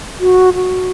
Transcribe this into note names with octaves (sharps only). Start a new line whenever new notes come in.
F#4
F#4